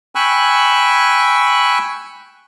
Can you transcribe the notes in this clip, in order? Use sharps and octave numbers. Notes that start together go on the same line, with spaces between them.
G5 G#5 B5 C#6 E6 F#6